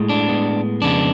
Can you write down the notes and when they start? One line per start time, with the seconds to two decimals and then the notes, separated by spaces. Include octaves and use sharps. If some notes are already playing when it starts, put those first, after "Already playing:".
Already playing: A2 G#3
0.09 D4
0.28 A2 G#3 B3
0.82 F2 C#3 G#3 B3 D4